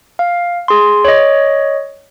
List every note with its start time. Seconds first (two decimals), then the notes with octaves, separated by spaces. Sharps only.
0.19 F5
0.68 G#4 C6
1.05 C#5 D#5